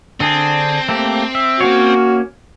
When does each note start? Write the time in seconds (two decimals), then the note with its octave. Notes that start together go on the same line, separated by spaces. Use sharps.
0.20 D3 C4 D4 G#4
0.89 A3 A#3 G4
1.35 E5
1.61 A#3 C#4 F#4 C#5